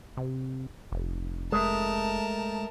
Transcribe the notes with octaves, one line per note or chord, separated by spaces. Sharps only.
C3
F1
G#3 A3 A#4 A5